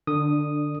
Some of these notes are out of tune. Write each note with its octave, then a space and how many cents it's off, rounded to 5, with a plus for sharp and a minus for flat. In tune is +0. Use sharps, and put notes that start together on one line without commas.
D3 +25 D4 +0 D#6 -5